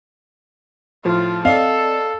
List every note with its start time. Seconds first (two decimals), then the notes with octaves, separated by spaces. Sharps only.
1.05 A2 F3 F4
1.45 C4 A4 D5 D#5 F5